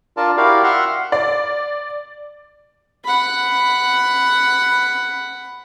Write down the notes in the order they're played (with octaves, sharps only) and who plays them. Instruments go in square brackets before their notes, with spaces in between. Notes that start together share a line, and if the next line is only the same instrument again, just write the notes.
[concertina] D4 F4 A#4 D5 A5
E4 F#4 G4 A#4 D5 F5
E5 F#5 C6 F6
[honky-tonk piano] D5
[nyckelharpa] F#5 B5